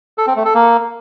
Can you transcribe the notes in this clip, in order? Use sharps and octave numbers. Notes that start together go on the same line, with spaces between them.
A4
C4
A3
A4
A#3